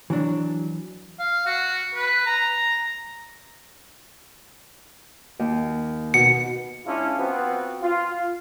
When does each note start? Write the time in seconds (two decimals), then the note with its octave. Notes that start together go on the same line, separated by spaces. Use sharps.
0.10 E3 F#3 D4
1.19 F5
1.46 F#4
1.95 B4
2.26 A#5
5.39 D#2
6.14 B2 C#7
6.86 G#3 C#4 D4 E4 F4
7.19 F3 B3 C4 F#4 G4 B4
7.83 F4